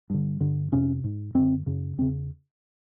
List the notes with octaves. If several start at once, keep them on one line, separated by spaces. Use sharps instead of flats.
G2 D3
G2 D3
F2 C3 C#4
G#2
F#2 D3 C4
F#2 C#3
E2 C#3 C4